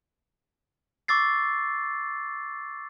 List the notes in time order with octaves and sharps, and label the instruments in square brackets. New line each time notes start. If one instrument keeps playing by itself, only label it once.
[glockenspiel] C#6 D6 E6 A6 C7